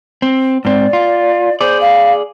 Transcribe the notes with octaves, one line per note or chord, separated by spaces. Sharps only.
C4
G#2 C4 D5
F4
G#4 C5 D5
F5